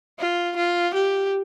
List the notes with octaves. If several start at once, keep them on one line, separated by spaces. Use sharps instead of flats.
F4
F4
G4